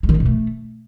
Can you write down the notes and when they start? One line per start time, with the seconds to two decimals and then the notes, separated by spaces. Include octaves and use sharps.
0.03 G#3
0.09 D#3
0.14 G#3
0.20 B2
0.26 A3